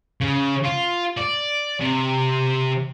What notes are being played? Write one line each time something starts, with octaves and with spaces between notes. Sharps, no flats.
C#3
F4
D5
C3